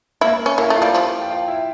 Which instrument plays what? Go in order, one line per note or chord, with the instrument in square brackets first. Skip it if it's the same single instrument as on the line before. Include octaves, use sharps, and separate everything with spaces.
[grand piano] A#3 A#4 [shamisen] E4
[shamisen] C#4
[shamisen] A#3 [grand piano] E4 E5
[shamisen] A3 [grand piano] E5
[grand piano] F4 F5
[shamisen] G3
F3
[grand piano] G5
F4 F5
E4 E5